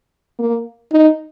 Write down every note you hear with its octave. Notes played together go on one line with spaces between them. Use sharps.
A#3
D#4